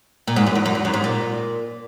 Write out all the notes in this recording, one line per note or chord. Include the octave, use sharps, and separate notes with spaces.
A#2
G#2
F#2
E2
F#2
E2
F#2
G#2
A#2